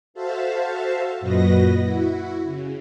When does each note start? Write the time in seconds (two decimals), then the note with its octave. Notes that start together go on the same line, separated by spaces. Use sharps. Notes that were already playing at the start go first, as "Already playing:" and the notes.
0.14 F#4 A4 C5 E5 F5 A5
1.20 F#2 A#2 F#4 B4 D#5 A#6
1.79 E4 F#4
2.45 C#3